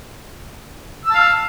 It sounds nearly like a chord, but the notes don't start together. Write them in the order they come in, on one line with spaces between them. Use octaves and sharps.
E6 A5 F5